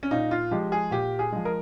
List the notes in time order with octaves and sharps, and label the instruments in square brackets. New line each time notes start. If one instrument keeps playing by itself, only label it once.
[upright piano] C#4
A#2 D#4
F4
F3 G#3 G4
G#4
A#2 G4
G#4
F3 G#3
A#4